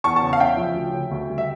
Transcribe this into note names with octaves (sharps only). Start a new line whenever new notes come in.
E2 A5 C#6
A5 C#6
C#3
F5
C#4 E5 G5
F3
D2
C#3
D2
G3
E5